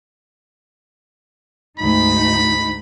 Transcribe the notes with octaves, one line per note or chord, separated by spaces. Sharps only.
D2 G#2 D#4 B5